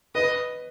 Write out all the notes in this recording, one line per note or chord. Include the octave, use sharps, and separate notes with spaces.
B4 D#5